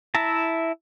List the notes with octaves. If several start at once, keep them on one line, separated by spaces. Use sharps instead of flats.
E4 E5 A5 A#5